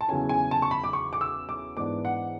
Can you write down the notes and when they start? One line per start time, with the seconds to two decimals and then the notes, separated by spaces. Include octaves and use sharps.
0.01 A5
0.08 E2 C#3 F#3 C#4 E4 G#5
0.29 G#5
0.51 A5
0.62 C#6
0.71 B5
0.84 D6
0.93 C#6
1.13 D6
1.21 E6
1.49 D6
1.77 G#2 E3 B3 D4 D6
2.05 F#5